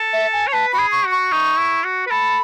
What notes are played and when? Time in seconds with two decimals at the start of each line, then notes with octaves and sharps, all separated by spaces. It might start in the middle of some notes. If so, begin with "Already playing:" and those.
Already playing: A4
0.13 E5
0.33 G#5
0.47 C#5
0.52 B4 A5
0.72 F#4 B5
0.79 G#4
0.92 C#6
1.05 F#4
1.11 C#6
1.32 D#4
1.58 E4
1.84 F#4
2.07 B4
2.11 A4 B5